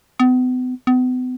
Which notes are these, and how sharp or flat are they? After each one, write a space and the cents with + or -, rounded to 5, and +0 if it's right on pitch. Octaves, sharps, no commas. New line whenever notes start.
B3 +40
B3 +40